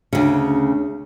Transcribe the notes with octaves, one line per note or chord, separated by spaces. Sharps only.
D2 C#3